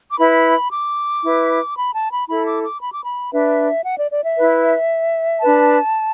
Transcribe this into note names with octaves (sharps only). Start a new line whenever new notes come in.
D6
E4 B4 B5
D6
E4 B4
B5
A5
B5
E4 A4 B5
D6
D6
B5
D6
B5
D4 B4 E5
F#5
D5
D5
E5
E4 B4
D4 B4 A5